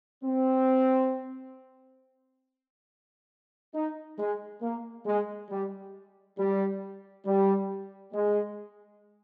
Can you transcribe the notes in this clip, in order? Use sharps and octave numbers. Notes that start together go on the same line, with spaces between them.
C4
D#4
G#3
A#3
G#3
G3
G3
G3
G#3